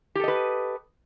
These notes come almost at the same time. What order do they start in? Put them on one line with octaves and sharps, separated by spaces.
G4 A4 D#5 B4